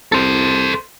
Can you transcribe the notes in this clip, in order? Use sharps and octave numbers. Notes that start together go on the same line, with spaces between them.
C2 A4 C5